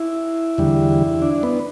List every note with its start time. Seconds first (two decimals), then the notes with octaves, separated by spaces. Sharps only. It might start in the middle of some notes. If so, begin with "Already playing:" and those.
Already playing: E4
0.58 E2 D3 G3
1.22 D4
1.43 B3